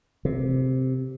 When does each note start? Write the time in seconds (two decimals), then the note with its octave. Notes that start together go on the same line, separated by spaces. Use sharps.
0.25 C3